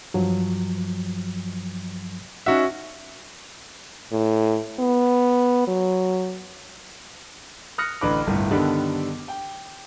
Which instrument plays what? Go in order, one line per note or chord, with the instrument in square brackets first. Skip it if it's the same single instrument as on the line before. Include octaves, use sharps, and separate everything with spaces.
[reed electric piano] G2 F3 F#3
[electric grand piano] C#4 F#4 E5 [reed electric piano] D#4 F#5
[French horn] A2
B3
F#3
[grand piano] D#6 F6 F#6 A#6 C#7
A1 D3 B4 D6
G1 C2 A2
G2 D3 D#3 G3 B3 A4
G5